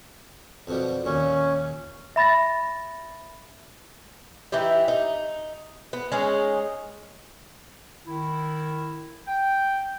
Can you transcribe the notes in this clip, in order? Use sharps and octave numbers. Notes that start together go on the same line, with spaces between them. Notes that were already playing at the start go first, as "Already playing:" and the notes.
F2 B2 G3
D#2 A#2 C#4
E5 B5 A6 A#6
E3 D#4 E4 G4
D#4
B3
G#3 C#4 D#4 G#4
D#3 E4
G5